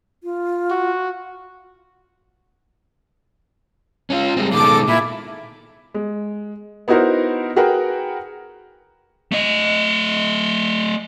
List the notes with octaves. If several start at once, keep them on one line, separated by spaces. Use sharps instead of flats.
F4
F#4
C#4 D4 F4
G3 G#3 C4
B2 D#3 G#3 A4 D6
A#2 E4 E5
G#3
B3 D#4 E4 F#4 A#4 C5
F#4 G#4 A#4 B4 F#5 G5
A3 D#5